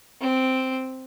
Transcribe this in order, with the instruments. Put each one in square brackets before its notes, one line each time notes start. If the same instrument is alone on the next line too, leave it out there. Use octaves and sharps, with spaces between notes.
[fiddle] C4